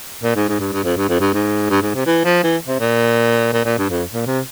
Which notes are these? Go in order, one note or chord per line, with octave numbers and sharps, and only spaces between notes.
A#2
G#2
G#2
G2
G2
F2
G2
F2
G2
G#2
G2
G#2
C3
E3
F3
E3
C3
A#2
A#2
A#2
G2
F2
A#2
C3